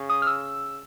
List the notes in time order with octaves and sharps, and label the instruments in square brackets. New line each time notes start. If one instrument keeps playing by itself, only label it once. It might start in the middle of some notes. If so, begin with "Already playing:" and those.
Already playing: [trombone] C#3
[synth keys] D#6
F6
E6